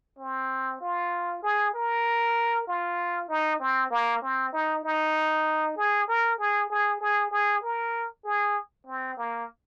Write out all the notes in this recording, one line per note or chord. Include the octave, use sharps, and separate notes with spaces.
C4
F4
G#4
A#4
F4
D#4
C4
A#3
C4
D#4
D#4
G#4
A#4
G#4
G#4
G#4
G#4
A#4
G#4
C4
A#3